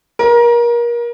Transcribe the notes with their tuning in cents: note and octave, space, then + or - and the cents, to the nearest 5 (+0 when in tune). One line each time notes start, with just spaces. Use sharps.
A#4 +30